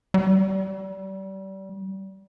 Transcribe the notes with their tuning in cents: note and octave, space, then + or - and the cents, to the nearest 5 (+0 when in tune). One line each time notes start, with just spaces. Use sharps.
G3 -30